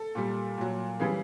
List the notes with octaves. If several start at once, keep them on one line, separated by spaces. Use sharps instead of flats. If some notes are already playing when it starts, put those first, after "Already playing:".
Already playing: A4
A#2 G3
A#2 F#3
C#3 E3 G3 G#4